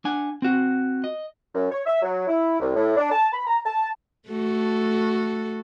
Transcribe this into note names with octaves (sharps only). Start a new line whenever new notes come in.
D4 F#5 G#5
C4 F#4
D#5
F#2
C#5
E5
F#3
E4
C2
A2
D4
A5
B5
A#5
A5
A3 F#4 A4